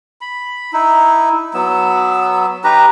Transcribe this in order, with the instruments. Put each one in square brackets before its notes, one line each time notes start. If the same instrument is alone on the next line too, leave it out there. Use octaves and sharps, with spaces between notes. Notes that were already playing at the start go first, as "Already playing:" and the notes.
[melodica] B5
D#4 E4
F#3 B3 E6
D#4 G4 B4 A#5